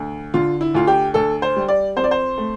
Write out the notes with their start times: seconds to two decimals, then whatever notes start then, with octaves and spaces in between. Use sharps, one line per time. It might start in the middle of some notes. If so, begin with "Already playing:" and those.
Already playing: D2
0.34 D3 F4
0.61 E4
0.75 D2 F4
0.87 G4
1.14 D2 A4
1.42 C5
1.56 G3
1.68 D5
1.96 F2 C5
2.04 D5
2.11 C5
2.38 A3